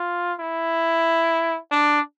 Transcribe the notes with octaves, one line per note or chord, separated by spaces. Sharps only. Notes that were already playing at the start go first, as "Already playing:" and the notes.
Already playing: F4
E4
D4